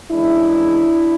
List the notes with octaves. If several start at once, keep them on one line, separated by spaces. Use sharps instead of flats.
D#2 C#3 E3 G#3 D4 E4